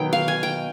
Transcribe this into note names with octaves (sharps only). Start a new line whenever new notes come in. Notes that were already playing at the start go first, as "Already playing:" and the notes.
Already playing: B2 D#3 F#3 B3 G5
F5
G#5
G5